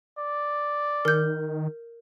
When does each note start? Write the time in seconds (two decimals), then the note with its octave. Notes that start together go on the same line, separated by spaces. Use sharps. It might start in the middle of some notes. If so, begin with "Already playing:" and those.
0.18 D5
1.05 D#3 A#4 G6